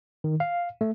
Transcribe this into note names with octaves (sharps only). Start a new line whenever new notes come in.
D#3
F5
A3